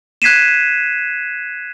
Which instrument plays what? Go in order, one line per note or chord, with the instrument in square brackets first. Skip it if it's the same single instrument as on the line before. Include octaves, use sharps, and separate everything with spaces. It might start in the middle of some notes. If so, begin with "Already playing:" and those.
[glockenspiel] F#6 G#6 B6 C7 D#7 E7